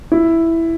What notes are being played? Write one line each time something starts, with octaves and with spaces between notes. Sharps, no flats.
E4